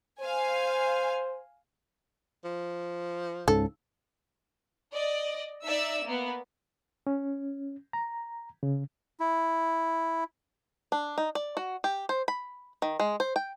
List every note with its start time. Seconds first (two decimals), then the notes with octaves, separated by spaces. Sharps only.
0.21 C5 F5 G#5
2.44 F3
3.48 C#2 G#2 C#3 A4
4.91 D5 D#5
5.65 D#4 D5 E5 E6
6.05 A#3 B3
7.07 C#4
7.93 A#5
8.63 C#3
9.20 E4
10.92 D4
11.18 D#4
11.35 D5
11.57 F#4
11.84 G4
12.09 C5
12.28 B5
12.82 D#3
13.00 G#3
13.20 C5
13.36 G5